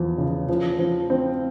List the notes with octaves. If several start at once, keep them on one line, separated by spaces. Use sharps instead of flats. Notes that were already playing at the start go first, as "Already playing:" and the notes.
Already playing: E2 F3
C#3
F3
F3
C4